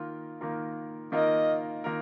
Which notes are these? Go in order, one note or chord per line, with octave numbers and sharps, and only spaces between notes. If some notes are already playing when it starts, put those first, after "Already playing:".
Already playing: D#3 A#3 F4 A#4
D#3 A#3 F4 A#4
D#3 A#3 F4 A#4 D#5
D#3 A#3 F4 A#4